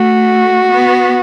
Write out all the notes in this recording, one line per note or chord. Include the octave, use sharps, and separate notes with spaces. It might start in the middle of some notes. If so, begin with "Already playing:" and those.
Already playing: A3 F#4
B3